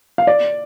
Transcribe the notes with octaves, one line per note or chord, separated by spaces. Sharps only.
F5
D5